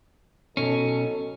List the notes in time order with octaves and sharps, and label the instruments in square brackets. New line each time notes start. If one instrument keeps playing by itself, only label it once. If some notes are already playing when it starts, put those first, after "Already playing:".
[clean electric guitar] B2 C#4 [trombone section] F#3 D#4 A4